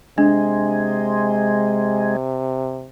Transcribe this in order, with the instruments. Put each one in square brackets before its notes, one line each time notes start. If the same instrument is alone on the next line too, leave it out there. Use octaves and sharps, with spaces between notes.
[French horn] C3 [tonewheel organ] G#3 [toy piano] D4